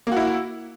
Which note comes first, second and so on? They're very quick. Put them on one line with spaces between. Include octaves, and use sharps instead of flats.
A#3 F#4 E4